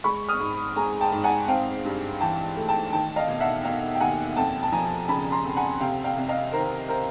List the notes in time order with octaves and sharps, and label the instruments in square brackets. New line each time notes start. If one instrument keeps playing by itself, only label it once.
[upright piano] G#3 B5 C#6
D#6 F6
G#2
G#3 G#5 A#5
G5 A5
G#2
F#5 G#5
C4 F5 G5
G2
E3 G5 A5
A3
G5 A5
D#3 G5 A5
D#5 F5
E1
E5 F#5
E1 F5 G5
G5
D#2 F#5 G#5
F2 G5 A5
A5
F3 G#5 A#5
C#3 A5 B5
A#5 C6
F2
F#5 G#5
C3 F5 G5
F5 G5
C2
D#5 F5
D#3 A#4 C5
A#4 C5